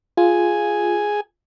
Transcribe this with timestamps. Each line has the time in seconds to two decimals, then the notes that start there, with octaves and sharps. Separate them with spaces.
0.17 F4 G#4 G#5